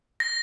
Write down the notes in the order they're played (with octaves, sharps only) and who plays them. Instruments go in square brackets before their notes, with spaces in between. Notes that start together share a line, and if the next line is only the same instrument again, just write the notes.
[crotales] A#6